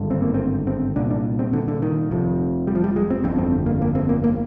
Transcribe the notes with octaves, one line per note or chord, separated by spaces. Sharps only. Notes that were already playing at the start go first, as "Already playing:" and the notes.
Already playing: G#1 G2 D3
C4
A#3
C4
C4
C2 A#2 D4
D4
C4
D3
D3
D#3
F1 F2 C3
G3
F3
G3
G#3
C4
G1 F2 D3 C4
C4
A#3
A#3
C4
A#3
A#3